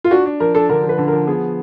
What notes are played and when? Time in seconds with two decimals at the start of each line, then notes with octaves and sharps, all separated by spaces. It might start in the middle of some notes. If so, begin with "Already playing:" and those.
0.04 F4
0.11 D4 F#4
0.26 D4
0.40 F3 A#4
0.54 D4 A4
0.69 D3 A#4
0.83 F3
0.89 B4
0.98 D3
1.08 F3 A#4
1.27 B3 G#4